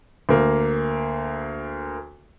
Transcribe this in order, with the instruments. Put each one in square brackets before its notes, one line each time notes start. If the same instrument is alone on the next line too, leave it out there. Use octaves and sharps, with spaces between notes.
[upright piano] D2 A#3